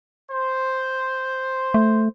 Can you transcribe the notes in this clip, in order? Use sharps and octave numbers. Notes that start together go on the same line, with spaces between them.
C5
A3